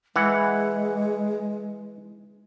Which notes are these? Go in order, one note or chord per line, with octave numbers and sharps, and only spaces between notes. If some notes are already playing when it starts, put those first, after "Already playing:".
E3 G#3 F#5